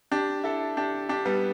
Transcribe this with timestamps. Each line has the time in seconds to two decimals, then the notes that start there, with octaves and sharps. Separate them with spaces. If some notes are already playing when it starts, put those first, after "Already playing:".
0.11 D4 G4
0.44 E4 A4
0.77 D4 G4
1.09 D4 G4
1.25 G3 B3